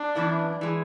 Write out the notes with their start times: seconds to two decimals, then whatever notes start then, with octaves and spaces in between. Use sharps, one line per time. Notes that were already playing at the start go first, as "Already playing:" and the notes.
Already playing: D4
0.15 F#2 E3 B3 E4
0.61 E3 G#3